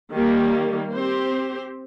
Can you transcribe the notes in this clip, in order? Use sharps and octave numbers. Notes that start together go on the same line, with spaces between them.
D#3 G3 A#3
C4 G4 C5